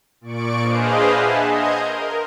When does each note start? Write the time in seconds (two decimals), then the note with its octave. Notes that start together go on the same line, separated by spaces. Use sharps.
0.21 A#2 D5 C#6 D7
0.62 D4 G#4 B4 C5 D#5 F5
1.11 E5 F#5 G#5 A5 B5
1.46 D#5 C6 F6 G6 G#6
1.83 A#4